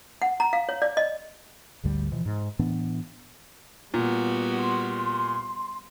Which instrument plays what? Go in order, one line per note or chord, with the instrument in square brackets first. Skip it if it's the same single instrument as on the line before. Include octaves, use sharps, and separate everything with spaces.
[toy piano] F#5
A#5
F5
C#5
D5
D#5
[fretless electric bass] G#1 D2 D3 G3
B2 E3 F3
G#2
A2 E3 B3 D4
[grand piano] A#2 [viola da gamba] G3 B3 F#4
[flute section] C6